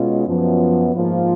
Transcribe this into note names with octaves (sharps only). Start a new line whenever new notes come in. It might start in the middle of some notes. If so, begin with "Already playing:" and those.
Already playing: B2 G#3 C#4 F4
F#2 F3 B3
G#2 F3 A#3 F4